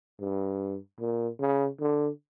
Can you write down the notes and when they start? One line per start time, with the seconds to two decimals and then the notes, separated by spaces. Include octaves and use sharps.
0.20 G2
1.00 A#2
1.40 C#3
1.81 D3